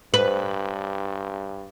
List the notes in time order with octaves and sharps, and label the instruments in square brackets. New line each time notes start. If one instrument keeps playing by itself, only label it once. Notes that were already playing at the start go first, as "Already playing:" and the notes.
[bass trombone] G2 [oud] B4